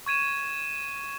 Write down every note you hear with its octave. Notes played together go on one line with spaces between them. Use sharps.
C#6 G#6 D#7 E7